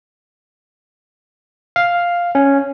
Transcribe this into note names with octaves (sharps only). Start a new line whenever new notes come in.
F5
C#4